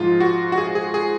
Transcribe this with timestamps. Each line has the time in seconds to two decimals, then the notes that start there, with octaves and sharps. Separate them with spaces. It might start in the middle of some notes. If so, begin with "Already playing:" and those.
Already playing: G#2 F3 G#3 F4
0.20 F#4
0.52 F#4
0.58 G#4
0.67 F#4
0.75 G#4
0.94 G#4